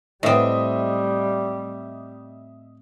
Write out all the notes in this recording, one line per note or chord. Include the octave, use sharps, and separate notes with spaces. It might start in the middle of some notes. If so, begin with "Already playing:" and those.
A2 G3 C4 D#5 E5 D#6